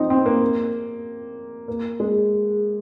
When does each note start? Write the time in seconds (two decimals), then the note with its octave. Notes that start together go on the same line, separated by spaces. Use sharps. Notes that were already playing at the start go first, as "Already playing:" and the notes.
Already playing: F3 C4 D#4
0.10 C4
0.26 A#3
1.68 A#3
2.00 G#3